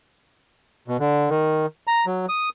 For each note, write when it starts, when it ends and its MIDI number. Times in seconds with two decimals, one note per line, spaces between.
0.88 0.97 47
1.00 1.30 50
1.30 1.66 51
1.87 2.05 82
2.06 2.26 54
2.29 2.49 87